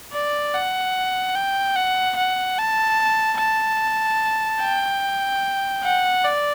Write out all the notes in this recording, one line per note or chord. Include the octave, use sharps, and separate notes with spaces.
D5
F#5
G5
F#5
F#5
A5
A5
G5
F#5
D5